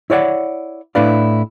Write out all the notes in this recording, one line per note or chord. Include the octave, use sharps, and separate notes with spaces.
E4 C#5 D5 F#5
A2 D4 E4 B4 D5 F5